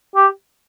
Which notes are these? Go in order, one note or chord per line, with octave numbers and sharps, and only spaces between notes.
G4